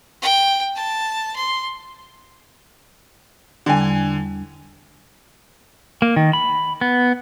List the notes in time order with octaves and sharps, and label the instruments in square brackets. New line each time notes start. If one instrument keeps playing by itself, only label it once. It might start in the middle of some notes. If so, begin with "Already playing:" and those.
[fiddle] G5
A5
C6
[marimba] E2 G3 D4 [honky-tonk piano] D3 G#5
[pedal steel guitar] A#3
D#3
B5
B3